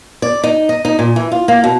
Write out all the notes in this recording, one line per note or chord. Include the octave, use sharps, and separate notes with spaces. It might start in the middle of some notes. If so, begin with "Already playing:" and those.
D5
D#4
D#5
D#4
A#2
E3
F4
A#3
B2